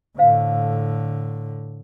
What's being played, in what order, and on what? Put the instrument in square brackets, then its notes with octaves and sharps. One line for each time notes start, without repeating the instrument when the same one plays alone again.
[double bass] A2 D3 [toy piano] C5 F5